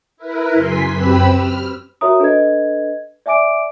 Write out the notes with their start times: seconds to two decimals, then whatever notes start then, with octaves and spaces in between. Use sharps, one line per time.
0.17 E4 A#4 B4
0.53 F#2 C#3 G#5 C6 B6
0.91 F#2 C4 G4 B4 B5 E6
1.33 F6
2.01 F#4 A#4 C#5 E5 A#5 D#6
2.20 D4 A4 B4 D#5 G#6
3.26 D5 E5 G#5 D6 D7